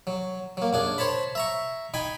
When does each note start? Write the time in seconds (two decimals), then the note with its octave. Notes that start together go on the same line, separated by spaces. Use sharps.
0.07 F#3
0.57 F#3 A#3
0.73 F#2 D4 G#4
0.98 C5 C#5 A5 B5
1.35 E5 A#5 C#6
1.94 D#4 G5 G#5 B5